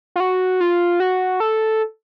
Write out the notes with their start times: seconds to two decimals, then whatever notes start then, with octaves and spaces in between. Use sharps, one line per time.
0.16 F4
0.20 F#4
0.61 F4
1.00 F#4
1.40 A4